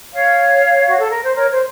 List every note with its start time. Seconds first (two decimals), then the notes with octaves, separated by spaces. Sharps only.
0.13 C#5 F5
0.87 F#4
0.99 A4
1.10 A#4
1.23 C5
1.35 A#4 C#5
1.50 C5